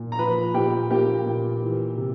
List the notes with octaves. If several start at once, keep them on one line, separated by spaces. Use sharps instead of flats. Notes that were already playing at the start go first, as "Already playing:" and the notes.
Already playing: A#2
A#5
F3 B4 B5
A#2 G4 G5
A#3 G4 G5
A#2
E3
C3